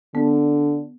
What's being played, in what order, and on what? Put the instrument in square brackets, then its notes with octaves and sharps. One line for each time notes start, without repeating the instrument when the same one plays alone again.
[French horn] D3 [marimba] B3